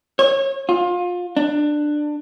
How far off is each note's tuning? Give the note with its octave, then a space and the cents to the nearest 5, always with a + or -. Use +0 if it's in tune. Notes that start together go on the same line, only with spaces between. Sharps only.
C#5 -25
F4 +25
D4 +15